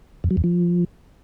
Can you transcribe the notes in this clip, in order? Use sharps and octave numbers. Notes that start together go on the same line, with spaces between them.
F2
F#3
E2
F3